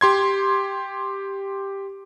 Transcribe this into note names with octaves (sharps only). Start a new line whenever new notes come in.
G4 C6 G#6